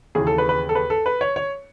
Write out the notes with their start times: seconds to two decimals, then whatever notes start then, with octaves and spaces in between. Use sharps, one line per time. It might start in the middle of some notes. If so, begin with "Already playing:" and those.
0.15 D#2 C#3 E3 G#4
0.27 A4
0.38 B4
0.49 B4
0.69 A4
0.75 B4
0.90 A4
1.06 B4
1.21 C#5
1.36 C#5